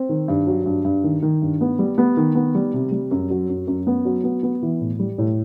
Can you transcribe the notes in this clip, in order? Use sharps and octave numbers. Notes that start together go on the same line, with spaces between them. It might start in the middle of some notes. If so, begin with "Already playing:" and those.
Already playing: C4
D#3
G2
F#3
G2
G2
D#3
D#3
G2
B3
G3
B3
D#3
B3
G3
C3
G3
F#2
F#3
F#2
F#2
B3
F#3
B3
B3
E3
A2
G3
A2